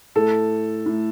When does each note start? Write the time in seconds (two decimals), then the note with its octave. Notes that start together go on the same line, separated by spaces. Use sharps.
0.15 A2 A4
0.86 A2